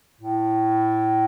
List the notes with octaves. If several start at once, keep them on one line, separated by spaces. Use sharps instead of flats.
A2